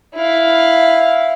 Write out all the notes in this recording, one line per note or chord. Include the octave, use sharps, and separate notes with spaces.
E4 F5